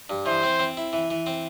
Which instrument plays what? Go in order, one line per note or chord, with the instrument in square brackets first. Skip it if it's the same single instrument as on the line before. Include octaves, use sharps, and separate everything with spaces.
[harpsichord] G2
[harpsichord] E3 [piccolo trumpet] C5
[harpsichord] C4
C4
E4
E3
E3
C4